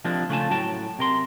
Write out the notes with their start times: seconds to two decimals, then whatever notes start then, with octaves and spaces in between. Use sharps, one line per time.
0.04 C3 F3 G#3 A#3 C4 D4
0.29 C#3 A3 F4 D5 G#5 A5
0.50 A2 F#3 F#4 G5 A5
0.99 C3 A#4 C6